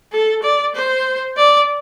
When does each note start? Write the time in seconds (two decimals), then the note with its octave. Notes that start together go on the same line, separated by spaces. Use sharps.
0.13 A4
0.43 D5
0.75 C5
1.37 D5